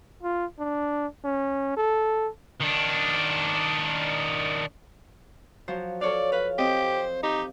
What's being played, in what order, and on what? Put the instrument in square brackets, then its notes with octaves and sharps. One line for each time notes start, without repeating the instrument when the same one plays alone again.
[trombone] F4
D4
C#4
A4
[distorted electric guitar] D#3 D4
[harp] F3 F#3 C5
[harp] A4 C#5 F5 [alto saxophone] D5
[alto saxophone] B4 [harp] F5
[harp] C4 D#5 [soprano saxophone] G4 [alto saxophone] C5
[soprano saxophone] D#4 [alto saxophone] G4